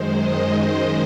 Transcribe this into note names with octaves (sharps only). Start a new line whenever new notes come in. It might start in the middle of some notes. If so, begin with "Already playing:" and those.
Already playing: F#2 D#3 G#3 C5
D#5
D#5